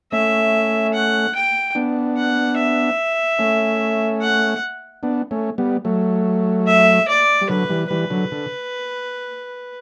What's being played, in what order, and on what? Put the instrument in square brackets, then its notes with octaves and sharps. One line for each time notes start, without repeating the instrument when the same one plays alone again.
[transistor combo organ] A3 C#4 [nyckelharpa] E5
[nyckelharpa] F#5
G5
[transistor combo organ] B3 D4
[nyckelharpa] F#5
E5
[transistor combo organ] A3 C#4
[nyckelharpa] F#5
[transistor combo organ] B3 D4
A3 C#4
G3 B3
F#3 A3
[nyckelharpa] E5
D5
[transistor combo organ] G3
[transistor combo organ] D3 F#3 [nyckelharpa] B4
[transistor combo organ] E3 G3
[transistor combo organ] E3 G3 [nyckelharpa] B4
[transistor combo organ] D3 F#3
D3